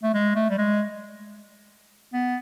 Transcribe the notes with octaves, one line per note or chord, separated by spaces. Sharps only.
A3
G#3
A3
G3
G#3
B3